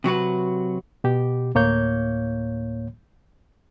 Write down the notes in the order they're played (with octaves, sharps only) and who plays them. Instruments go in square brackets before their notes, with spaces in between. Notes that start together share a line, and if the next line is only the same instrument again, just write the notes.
[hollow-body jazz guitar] C3 F#3 F#4 B4
[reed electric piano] B2 G4
D2 A2 A#3 C#5 G6